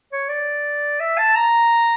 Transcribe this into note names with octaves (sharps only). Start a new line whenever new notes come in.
C#5
D5
E5
A5
A#5